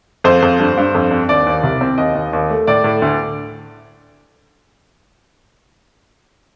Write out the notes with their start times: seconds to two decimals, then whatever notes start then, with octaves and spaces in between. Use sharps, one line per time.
0.24 F2 C5
0.42 F2
0.59 G2
0.77 G2
0.94 F2
1.11 C4
1.29 D#2 D5
1.46 D#2
1.63 C2
1.81 C4
1.98 D#2 D#5
2.15 D#2
2.33 D#2
2.50 A3
2.67 A2 D5
2.84 A2
3.02 D2